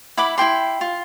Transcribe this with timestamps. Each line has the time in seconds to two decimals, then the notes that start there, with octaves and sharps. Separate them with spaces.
0.17 E4 F#5 B5 D6
0.38 E4 F4 G5 C6
0.81 F4